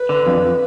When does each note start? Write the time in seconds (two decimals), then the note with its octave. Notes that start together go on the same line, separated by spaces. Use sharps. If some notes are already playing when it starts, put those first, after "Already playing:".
Already playing: B4
0.09 D3
0.27 F2